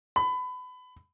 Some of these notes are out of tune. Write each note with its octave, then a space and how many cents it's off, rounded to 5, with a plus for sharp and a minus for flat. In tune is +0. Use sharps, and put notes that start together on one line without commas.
B5 +25